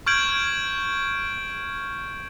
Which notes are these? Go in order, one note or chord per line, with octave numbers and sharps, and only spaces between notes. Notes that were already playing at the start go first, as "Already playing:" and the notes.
C#6 F6 G6 G#6 D7 F#7